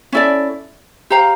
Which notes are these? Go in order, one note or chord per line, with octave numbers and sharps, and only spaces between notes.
C#4 E4 A4 D5
G4 C5 F5 A#5